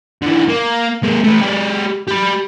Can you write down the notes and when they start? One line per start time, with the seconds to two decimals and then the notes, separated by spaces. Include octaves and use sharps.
0.22 D3 E3
0.49 A#3
1.03 G#3 A#3
1.24 A3 B4
1.40 G#3 G4
2.08 G4 B5